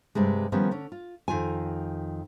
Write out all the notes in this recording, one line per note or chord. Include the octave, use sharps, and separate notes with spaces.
G2 C3 G3 G#3
D#3 F3 G3 B3 C#4
D3 C#4
F4
F2 D#3 F4 G#5